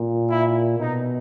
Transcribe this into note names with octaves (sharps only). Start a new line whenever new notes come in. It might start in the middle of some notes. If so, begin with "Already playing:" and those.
Already playing: A#2
E4
B2 D#4